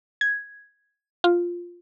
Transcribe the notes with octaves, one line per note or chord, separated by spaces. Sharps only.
G#6
F4